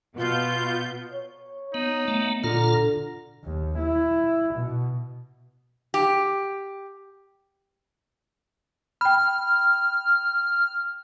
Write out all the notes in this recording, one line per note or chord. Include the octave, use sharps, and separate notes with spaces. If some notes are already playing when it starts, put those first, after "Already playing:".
B2 B3 F4 G6
C#5
B3 D#4
A3 B3
A#2 D3 F4 A#5
D#2
E4
B2
G4
G5 B5 F6